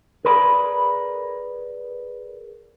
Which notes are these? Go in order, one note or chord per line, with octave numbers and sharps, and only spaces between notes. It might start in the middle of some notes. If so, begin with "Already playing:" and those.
G#4 A#4 B4 D5 A5 B5